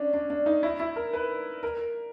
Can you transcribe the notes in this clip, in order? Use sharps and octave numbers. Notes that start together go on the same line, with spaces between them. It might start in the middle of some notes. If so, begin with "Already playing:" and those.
Already playing: C#4 D4
D4
D4
D#4
E4
E4
A#4
B4
A#4